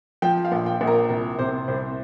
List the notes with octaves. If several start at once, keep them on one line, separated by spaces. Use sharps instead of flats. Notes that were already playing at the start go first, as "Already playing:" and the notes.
F3 G5
F5
A#1
G5
A#1
A#4
C2 A#4
C3 C5
C2 C5